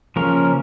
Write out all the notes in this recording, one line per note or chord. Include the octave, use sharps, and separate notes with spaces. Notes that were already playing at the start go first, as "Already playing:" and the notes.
C#3 F3 A#3 C#4 A#4